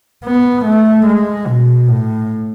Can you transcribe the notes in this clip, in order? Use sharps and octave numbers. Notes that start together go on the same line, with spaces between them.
B3
A3
G#3
B2
A2